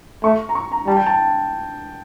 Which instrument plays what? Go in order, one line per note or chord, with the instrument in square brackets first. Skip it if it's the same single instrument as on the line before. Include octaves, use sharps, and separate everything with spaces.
[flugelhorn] A3 [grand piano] C#6
[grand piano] A#5
C#6
A#5
[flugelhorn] G3 [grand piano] A5
[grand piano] G5
A5